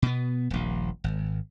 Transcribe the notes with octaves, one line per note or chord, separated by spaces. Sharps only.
B2 B3
D#1 A#1
G#1